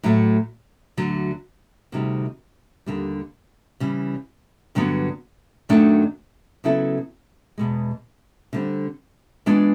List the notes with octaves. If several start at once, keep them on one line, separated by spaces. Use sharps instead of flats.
A2 F#3 A3
D2 D3 F#3
D2 C3 D#3 G3
D#2 D3 G3
C#3 E3 G3
G2 D3 F#3 B3
F#2 D#3 F#3 A3 D4
C#3 F#3 B3 E4 A4
E2 B2 G#3
D3 G3 C4
E3 G#3 B3 D4 F4